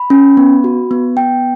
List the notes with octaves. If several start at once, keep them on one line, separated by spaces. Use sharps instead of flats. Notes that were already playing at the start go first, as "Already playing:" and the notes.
Already playing: B5
C#4
B3
F#4
B3
B3 G5